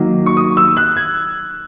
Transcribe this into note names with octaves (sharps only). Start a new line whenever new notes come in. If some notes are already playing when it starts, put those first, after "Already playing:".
Already playing: D#3 F#3 A#3
C#6
D#6
E6
F#6
G#6